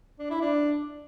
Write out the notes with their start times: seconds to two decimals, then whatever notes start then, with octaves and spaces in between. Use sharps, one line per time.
0.19 D4
0.30 E4
0.41 D4